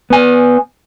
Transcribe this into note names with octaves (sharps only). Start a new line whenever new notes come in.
B3 G#5